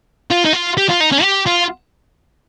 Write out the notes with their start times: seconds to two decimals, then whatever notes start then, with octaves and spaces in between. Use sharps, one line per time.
0.31 F4
0.45 D#4
0.53 F4
0.77 G4
0.89 F4
1.00 D#4
1.12 C#4
1.23 G4
1.46 F4